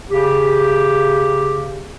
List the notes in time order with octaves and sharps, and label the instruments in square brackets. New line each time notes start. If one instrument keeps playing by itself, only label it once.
[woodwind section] C#3 G4